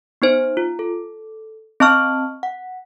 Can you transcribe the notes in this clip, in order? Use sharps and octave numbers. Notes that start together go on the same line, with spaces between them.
B3 D#4 C5
F4
A4
C4 D#5 A5 C#6 F6
F#5